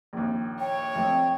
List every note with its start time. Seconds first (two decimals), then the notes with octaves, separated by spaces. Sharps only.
0.13 A#1 D#2
0.60 C#5 G5
0.95 F2 A3